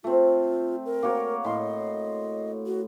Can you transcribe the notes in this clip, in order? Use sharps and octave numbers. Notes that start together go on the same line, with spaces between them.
A3 C4 F4
A#4
A#3 F#4 C#5
A2 D#5 C6
F#4